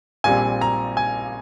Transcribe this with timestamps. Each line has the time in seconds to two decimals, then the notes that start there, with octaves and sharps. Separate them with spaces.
0.24 A#1 A#2 G3 C4 G#5
0.61 A#5
0.97 G#5